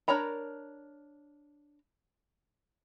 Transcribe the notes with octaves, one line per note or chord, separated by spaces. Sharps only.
D4 A#4 C#5 A#5 B5